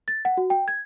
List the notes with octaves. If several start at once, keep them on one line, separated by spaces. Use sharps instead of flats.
A6
F#5
F#4
G5
G#6